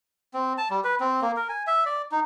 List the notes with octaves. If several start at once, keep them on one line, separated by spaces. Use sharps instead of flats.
C4
A5
G3
B4
C4
A#3
A#4
G#5
E5
D5
D#4